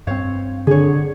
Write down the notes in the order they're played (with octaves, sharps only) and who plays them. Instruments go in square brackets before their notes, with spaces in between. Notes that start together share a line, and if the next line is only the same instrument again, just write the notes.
[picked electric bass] G2 C4 [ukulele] C5 C#5 F5
[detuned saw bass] D3 [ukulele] G#4 C#5